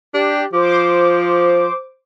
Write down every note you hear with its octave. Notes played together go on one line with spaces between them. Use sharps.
D4 G4
F3 C5 D6